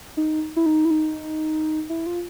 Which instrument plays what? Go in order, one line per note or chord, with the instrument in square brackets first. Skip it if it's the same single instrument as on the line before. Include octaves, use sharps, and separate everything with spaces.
[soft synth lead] D#4
E4
D#4
E4
D#4
E4
F4